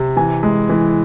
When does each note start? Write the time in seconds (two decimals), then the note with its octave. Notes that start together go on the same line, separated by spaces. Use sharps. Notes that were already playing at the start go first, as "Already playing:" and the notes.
Already playing: C3
0.17 E3 G#5
0.43 G#3
0.69 E3